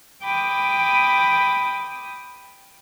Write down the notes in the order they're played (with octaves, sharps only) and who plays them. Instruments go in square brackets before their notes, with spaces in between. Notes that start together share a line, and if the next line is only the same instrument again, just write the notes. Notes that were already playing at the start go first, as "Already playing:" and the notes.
[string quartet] G5 B5 D6 D#6